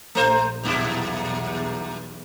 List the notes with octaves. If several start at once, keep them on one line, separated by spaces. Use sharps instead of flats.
A#1 A3 C5
B1 E2 G2 A#2 E4